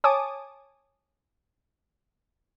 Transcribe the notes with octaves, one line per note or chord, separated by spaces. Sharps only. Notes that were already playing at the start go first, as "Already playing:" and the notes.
C#5 G#5 A5 D6 D#6